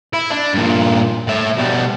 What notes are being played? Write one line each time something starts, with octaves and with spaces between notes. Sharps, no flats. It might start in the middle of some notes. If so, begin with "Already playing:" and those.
E4
D4
G2 A#2
A2 E5
B2 G3